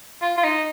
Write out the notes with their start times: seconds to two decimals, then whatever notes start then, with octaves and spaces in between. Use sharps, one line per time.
0.22 F4
0.38 F4
0.44 D#4